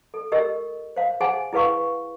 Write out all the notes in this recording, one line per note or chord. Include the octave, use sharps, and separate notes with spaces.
A4
G4 A#4 D#5 E6
C5 F5
G#4 C5 F#5 G#5
E4 G#4 B4 F5 C#6